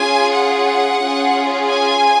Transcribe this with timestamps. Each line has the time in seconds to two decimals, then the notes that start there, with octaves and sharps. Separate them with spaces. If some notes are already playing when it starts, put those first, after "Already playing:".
Already playing: C#4 F4 G#4 G#5
0.33 F#5
1.01 C#4 F4 G#4
1.69 G#5